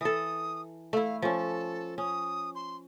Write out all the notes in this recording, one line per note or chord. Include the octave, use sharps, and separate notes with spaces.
E3 A4 D#6
A3 E4 F5
F3 C#4 A4
C#4 D#6
C6